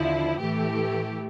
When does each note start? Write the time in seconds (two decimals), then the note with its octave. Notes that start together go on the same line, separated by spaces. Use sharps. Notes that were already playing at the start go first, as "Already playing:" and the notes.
Already playing: D#2 D3 F3 E4
0.39 A2 E3 A3 G4